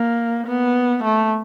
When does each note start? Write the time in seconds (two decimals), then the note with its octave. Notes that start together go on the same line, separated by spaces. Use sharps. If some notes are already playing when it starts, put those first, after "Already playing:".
Already playing: A#3
0.47 B3
1.04 A3